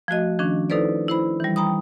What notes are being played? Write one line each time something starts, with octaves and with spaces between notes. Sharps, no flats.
F3 A3 F#4 D#5
D#3 F3 C#4 D4
D#4 E4 A4 B4 C5 D5
E4 C5 B5
E3 G3
G5 A#5 B5 D#6